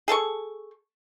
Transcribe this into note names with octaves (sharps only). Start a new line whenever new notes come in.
G#4 A4 A5 C#6